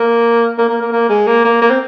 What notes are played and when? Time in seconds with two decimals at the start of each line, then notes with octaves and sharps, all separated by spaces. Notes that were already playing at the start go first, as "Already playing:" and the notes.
Already playing: A#3
0.58 A#3
0.69 A#3
0.81 A#3
0.93 A#3
1.10 G#3
1.27 A#3
1.45 A#3
1.62 A#3
1.70 C4